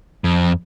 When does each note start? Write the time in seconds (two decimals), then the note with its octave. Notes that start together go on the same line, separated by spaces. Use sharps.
0.24 F2